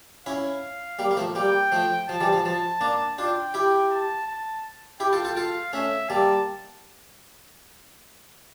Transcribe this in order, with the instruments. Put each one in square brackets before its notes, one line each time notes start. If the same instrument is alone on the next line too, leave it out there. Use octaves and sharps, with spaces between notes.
[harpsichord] C#4 E4 [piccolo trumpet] F5
[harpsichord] G3 A#3
A#3
F3 A3
[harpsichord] G3 A#3 [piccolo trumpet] G5
[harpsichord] F3 A3
[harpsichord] F3 [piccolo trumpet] A5
[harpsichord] E3 G3
F3
[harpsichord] F3 [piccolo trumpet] A5
[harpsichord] A#3 D4
[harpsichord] D4 F4 [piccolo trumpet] G5
[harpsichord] E4 G4
[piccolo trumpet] A5
A5
[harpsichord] E4 G4 [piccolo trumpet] G5
[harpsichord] F4 A4
F4 A4
[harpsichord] F4 A4 [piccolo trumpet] F5
[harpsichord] A3 C#4 [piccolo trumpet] E5
[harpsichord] G3 A#3 [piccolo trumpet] A5